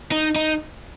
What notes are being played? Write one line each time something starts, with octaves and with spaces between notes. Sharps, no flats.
D#4
D#4